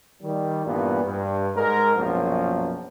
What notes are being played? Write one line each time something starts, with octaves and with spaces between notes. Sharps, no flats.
D#3 G3
G2 A#2 E3 B3
G2
G#2 G#3 A#4
A#1 F#2 B2 F3